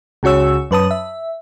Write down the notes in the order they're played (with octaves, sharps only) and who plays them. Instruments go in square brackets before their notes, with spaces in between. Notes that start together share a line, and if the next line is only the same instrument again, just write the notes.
[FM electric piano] C#2 C#3 F#4 C#5 E6
F#2 B4 A5 D#6
E5